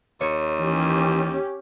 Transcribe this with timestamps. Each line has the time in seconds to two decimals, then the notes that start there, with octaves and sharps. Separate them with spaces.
0.21 D#2 C#5
0.59 E3 C#4 G4